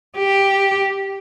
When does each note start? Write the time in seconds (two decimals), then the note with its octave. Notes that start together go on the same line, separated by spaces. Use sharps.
0.18 G4